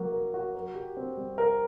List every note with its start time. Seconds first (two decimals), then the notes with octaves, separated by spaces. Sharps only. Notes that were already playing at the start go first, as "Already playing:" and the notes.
Already playing: F#3 A#3 F#4
0.12 A#4
0.34 F#4
0.55 A#4
0.75 G4
0.97 C4
1.17 G3
1.38 A#4